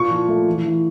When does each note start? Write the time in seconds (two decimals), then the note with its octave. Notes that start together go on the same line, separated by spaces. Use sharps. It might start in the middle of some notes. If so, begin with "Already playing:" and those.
Already playing: A#2 C#6
0.10 F3
0.28 A3
0.47 E3
0.64 E3